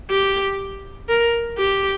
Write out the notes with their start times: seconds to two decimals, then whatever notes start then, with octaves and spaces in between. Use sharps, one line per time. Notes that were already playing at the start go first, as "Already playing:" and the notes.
0.10 G4
1.09 A#4
1.57 G4